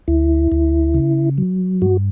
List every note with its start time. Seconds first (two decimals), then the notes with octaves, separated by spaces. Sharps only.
0.08 D2 E4
0.52 D2
0.94 C#3
1.38 F#3
1.82 G2 F#4